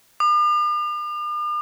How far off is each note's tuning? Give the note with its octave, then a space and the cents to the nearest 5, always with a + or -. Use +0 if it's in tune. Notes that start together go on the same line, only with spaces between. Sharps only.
D6 +45